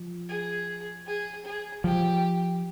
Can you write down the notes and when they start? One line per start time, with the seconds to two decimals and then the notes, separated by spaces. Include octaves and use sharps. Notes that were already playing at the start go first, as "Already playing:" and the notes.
Already playing: F3
0.29 G#4
1.07 G#4
1.46 G#4
1.84 F3 G4